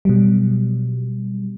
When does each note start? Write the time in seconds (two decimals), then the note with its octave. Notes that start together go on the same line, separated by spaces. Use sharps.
0.05 B2 F#3 G3